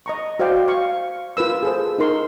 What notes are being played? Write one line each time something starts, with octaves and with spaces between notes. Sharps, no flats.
D#5 A#5 C#6
F#4 C5 D5 F5 G5
F5 C#6
F4 A#4 B4 E6
G#4 A4 C5
D#4 F4 A#4 C6 C#6